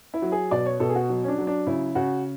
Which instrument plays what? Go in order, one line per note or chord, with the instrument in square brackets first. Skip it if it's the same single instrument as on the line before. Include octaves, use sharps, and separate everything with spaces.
[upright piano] E4
F#3
G#4
B2 D5
C#5
B2 A4
G#4
F#4
F#3
C#4
D4
F#3
D4
C#3 E4
C#3 F#4